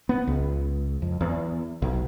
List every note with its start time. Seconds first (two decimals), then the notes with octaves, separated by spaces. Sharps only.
0.09 B3
0.27 C#2
1.02 F2
1.21 E2
1.82 B1